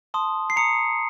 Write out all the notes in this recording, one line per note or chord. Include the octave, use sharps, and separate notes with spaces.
A5 C6 D#6
C7
A#5 D#6 C#7